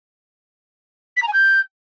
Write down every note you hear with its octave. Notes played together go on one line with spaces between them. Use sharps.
B6
A#5
G#5
G6